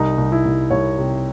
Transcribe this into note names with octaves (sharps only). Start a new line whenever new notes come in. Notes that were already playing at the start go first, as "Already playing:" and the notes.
Already playing: C2 D#4
C2
E4
C2
C2 C#5
C3